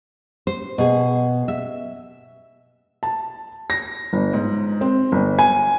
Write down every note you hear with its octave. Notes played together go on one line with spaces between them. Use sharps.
C5
B2 G#4
E5
A5
A#6
G1
G#2
C4
G1
G#5